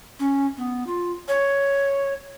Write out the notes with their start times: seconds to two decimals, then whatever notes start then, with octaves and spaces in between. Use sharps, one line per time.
0.19 C#4
0.57 B3
0.87 F4
1.28 C#5